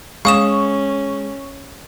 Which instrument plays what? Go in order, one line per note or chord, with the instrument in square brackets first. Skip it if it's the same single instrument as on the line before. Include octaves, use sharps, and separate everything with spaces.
[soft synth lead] G#3 [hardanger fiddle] C#4 [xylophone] F5 D#6 E7 [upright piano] C#6